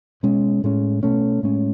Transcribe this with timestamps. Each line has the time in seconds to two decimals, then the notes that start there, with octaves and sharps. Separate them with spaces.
0.23 B2 G#3 C#4
0.64 A2 G#3 C#4
1.03 B2 A3 C#4
1.43 A2 G#3 C#4